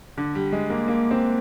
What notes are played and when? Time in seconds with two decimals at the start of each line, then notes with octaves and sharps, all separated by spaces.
0.17 D3
0.35 G3
0.53 G#3
0.70 A#3
0.88 A#3
1.11 C4